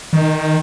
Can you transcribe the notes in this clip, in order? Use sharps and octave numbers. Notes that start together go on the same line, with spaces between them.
D#3